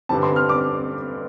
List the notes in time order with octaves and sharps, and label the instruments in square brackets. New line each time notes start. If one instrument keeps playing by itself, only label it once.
[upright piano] G2 D3 G3 C4 [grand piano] A5
[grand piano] C6
F6
D6